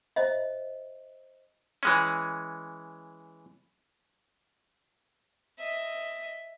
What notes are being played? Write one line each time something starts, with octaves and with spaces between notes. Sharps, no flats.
C5 D#5 E5
E3 G#3 C#4
D#5 E5